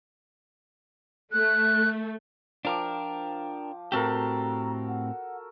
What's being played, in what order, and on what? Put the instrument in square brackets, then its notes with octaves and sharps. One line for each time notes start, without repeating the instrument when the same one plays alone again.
[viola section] A3 [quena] F#6
[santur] F3 D6 [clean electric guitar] D4 A#4 [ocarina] G5
[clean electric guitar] A2 C4 G4 [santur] F#4 A4 A#4 [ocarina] A#5
[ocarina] F#5